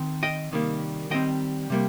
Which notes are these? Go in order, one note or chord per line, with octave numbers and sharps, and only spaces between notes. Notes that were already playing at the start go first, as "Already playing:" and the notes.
Already playing: D#3 C4
D#5 G5
C3 D#3 G3 A#3
D#3 G3 C4 D#5 G5
C3 G3 A#3